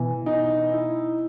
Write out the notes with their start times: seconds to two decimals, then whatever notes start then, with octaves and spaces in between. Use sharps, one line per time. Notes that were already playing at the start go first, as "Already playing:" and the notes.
Already playing: B2 E3
0.26 D#4
0.72 E4